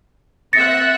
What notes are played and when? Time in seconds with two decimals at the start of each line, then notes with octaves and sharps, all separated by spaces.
0.53 C4 E5 F#5 A6 A#6 C#7